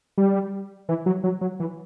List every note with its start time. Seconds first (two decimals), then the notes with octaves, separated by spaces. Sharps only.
0.17 G3
0.89 E3
1.06 F#3
1.24 F#3
1.41 F#3
1.60 E3